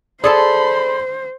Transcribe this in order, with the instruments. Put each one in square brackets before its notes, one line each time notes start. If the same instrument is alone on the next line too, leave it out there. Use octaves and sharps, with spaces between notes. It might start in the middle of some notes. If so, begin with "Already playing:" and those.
[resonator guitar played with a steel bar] G#4 A4 A5 [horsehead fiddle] C5 [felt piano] D5 [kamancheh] B5 C6